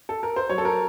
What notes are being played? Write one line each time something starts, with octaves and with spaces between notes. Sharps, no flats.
A4
A#4
C5
F#3 C#5
A4
A#4